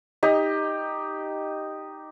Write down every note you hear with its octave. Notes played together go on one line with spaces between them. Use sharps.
D#4 G4 D#5